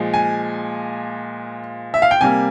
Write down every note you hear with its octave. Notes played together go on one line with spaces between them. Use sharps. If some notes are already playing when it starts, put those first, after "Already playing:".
Already playing: A#2 F3 G#3
G#5
E5
F5
G5
C3 G3 A#3 G#5